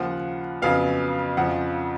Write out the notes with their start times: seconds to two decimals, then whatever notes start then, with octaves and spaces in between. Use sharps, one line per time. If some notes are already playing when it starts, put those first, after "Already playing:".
Already playing: D#2 C#3 F3 F#5
0.62 F2 C#3 F#3 B3 F5
1.37 F2 C#3 F3 F#5